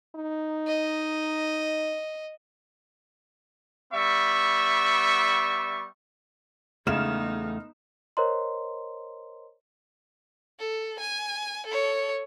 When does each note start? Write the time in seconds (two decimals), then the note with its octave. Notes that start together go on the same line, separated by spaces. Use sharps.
0.16 D#4
0.67 D#5
3.93 G3 B3 E5 C#6
6.87 E2 C#3 G#3 A3 B3 D#4 F6 E7
8.17 A#4 C5 C#5 D#5 A#5 C6
10.59 A4
11.00 G#5
11.67 A4 C#5